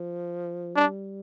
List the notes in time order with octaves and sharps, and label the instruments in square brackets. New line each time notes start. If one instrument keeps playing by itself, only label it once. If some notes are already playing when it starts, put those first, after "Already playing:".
Already playing: [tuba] F3
[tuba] G3 [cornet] D4